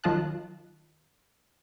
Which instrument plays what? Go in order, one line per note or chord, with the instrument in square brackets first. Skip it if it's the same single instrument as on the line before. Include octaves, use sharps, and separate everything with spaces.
[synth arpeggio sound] D#3 F#3 F4 D#5 A5 F#6